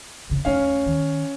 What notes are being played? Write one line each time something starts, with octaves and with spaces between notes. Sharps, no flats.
F1 C#3
D#2 A3 C#4 F5
D#3